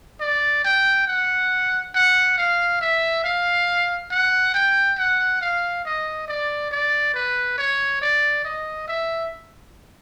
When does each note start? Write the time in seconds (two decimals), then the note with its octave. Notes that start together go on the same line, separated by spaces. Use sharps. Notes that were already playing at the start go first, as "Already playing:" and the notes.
0.21 D5
0.64 G5
1.08 F#5
1.95 F#5
2.38 F5
2.81 E5
3.24 F5
4.11 F#5
4.54 G5
4.98 F#5
5.42 F5
5.85 D#5
6.28 D5
6.71 D5
7.15 B4
7.58 C#5
8.02 D5
8.45 D#5
8.88 E5